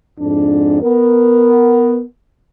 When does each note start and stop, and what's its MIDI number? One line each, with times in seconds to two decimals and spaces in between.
0.20 0.81 41
0.20 0.81 44
0.20 0.81 62
0.83 2.02 59
0.83 2.02 70